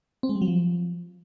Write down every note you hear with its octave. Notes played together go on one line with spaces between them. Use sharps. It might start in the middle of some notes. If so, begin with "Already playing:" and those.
C4
G#3
G3
F#3
F3